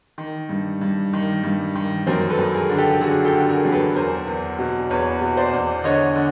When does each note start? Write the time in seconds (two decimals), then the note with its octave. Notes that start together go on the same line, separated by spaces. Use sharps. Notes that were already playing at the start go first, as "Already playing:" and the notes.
0.18 D#3
0.49 G2
0.81 G2
1.13 D#3
1.44 G2
1.75 D#3
2.07 F#2 A#4 C5
2.30 A4 B4
2.39 F#2
2.54 G#4 A#4
2.70 D3
2.78 G4 A4
3.01 D3 F#4 G#4
3.25 G4 A4
3.33 D3
3.49 G#4 A#4
3.65 F#2
3.72 A4 B4
3.95 E2 A#4 C5
4.27 E2
4.59 B2
4.90 E2 B4 C#5
5.21 B2
5.37 C5 D5
5.54 E2
5.84 D3 C#5 D#5
6.16 D3